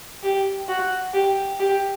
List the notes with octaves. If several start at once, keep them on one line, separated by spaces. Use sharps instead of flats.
G4
F#4
G4
G4